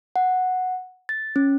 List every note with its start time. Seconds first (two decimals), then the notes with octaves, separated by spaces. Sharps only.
0.16 F#5
1.09 A6
1.36 C#4